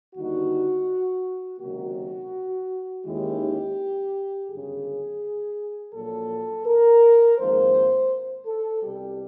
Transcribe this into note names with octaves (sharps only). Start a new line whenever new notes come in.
D#2 D3 G3 B3 D#4 F#4
C#2 C3 D#3 F#3 A#3 F#4
D#2 D#3 G#3 C#4 E4 G4
G1 F#2 C#3 G#4
A#1 A#2 F#3 A#3 A4
A#4
G#1 G#2 F3 A#3 C5
A4
C2 B2 G3 G4